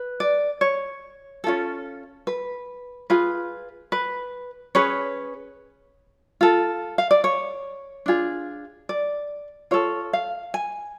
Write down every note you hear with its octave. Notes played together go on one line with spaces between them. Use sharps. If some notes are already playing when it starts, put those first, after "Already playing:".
Already playing: B4
D5
C#5
C#4 F4 A4
B4
F4 G#4 B4
B4
C#4 G#4 B4 C#5
F4 A4
F5
D5
C#5
D4 F4 G#4
D5
F4 A4 C#5
F5
G#5